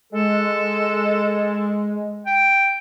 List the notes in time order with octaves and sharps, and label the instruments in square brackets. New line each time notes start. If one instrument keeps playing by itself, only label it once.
[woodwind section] G#3 [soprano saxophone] A4
[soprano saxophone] G5